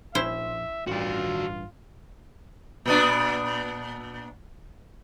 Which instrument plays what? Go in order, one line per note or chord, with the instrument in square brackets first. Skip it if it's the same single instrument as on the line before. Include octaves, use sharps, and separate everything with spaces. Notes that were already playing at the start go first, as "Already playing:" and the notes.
[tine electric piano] A#1 [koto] C#4 E4 C5 [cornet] E5
[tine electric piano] A1 G2 [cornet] F4 [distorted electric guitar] F#4 D5
[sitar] A#2 B3 D4